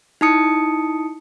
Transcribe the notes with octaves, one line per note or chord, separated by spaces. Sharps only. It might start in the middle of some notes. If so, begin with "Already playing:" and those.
D#4 E4 A5 D#6 C#7